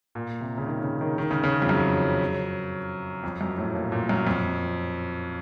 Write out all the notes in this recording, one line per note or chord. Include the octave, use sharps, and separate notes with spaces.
A#2
C3
C#3
D#3
C#3
D#3
D#3
C#3
C#3
F2
F#2
F2
F#2
A2
A#2
A#2
F#2
F2